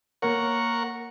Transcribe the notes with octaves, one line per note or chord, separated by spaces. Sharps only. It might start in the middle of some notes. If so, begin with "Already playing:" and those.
A#3 A#4 C#5 F#5 C#6